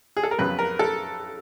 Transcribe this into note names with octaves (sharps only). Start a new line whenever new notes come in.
G#4
A4
A#4
F2 C#3 F#3 B3 B4
A#4
A4